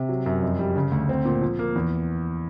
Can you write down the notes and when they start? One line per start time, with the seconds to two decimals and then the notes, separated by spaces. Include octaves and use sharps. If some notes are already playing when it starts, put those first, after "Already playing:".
Already playing: C3
0.09 F#3
0.26 F#2
0.43 F2
0.59 G3
0.76 C#3
0.91 D2
1.09 C4
1.25 A#2
1.42 F3
1.59 A#3
1.75 E2